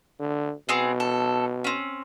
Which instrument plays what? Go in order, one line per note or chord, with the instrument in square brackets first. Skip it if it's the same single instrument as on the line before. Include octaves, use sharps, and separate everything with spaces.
[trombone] D3
[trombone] B2 [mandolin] B3 C4 G#4
[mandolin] A4
C4 C#4